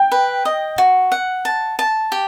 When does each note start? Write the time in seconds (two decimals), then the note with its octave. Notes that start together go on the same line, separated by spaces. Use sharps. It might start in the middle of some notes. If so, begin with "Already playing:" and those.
Already playing: G5
0.12 B4
0.45 D#5
0.78 F#4
1.12 F#5
1.45 A5
1.79 A5
2.12 G4